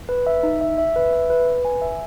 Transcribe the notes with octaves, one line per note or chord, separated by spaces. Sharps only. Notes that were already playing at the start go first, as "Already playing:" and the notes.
B4
E5
D#4
E5
E5
B4
E5
B4
B4
G#5
E5